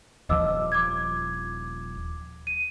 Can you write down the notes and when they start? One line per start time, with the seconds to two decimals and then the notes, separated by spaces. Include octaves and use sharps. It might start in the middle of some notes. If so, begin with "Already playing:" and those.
0.29 D#1 F3 D#5 D6 E6
0.72 D6 G#6
2.47 D#7